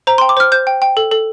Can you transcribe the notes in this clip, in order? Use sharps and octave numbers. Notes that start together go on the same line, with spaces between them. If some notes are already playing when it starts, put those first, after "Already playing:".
C5 A#5
G5 C6
D6
C5 F6
C5 G6
G5
G5
A4
A4